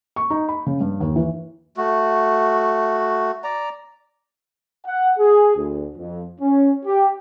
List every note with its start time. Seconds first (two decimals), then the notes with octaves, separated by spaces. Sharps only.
0.16 C#6
0.30 D#4
0.49 B5
0.66 C#3
0.81 G2
1.00 D#2
1.16 E3
1.77 A3 F#4
3.44 D5 A#5
4.86 F#5
5.19 G#4
5.57 D2
5.97 F2
6.41 C#4
6.86 G4